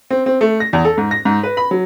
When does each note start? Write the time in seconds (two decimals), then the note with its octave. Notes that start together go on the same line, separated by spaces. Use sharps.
0.10 C4
0.26 C4
0.41 A3
0.60 A#6
0.73 E2
0.85 A4
0.98 G#2
1.11 A#6
1.25 G#2
1.43 B4
1.57 B5
1.71 F#3